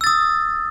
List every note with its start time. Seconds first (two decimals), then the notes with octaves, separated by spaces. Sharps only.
0.01 E6
0.04 A6
0.07 D#6